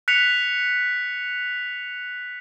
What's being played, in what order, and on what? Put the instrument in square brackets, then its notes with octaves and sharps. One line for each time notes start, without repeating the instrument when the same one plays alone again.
[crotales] F#6 B6 C#7 F7